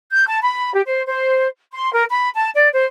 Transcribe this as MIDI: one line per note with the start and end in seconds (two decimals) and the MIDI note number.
0.11 0.26 91
0.28 0.40 81
0.42 0.73 83
0.73 0.81 67
0.86 1.02 72
1.06 1.46 72
1.71 1.91 84
1.93 2.03 70
2.09 2.29 83
2.35 2.50 81
2.55 2.69 74
2.73 2.84 72